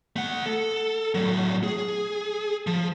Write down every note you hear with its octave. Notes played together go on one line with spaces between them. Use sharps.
A3 F#5
A4
A2 F#3
G#4
F3